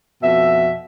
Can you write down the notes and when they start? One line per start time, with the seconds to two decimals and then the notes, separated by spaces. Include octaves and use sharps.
0.23 F2 B2 E5